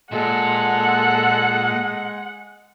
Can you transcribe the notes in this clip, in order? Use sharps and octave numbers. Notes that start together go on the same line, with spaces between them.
A#2 G#3 A4 F#5